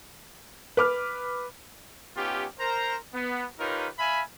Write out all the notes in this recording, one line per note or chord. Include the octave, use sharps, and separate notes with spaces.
B4 D6 F6
B3 C#4 D#4 F4 G4
A#4 C5 A#5
B3
D#4 F4 G4 A#4 B4 C#5
E5 F5 G#5 B5